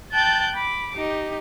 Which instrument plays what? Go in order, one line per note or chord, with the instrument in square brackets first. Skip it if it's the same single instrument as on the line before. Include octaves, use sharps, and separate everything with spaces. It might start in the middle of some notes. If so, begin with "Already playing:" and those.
[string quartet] G5 A5 F#6 G6 A6
B5 D6
D#4 G4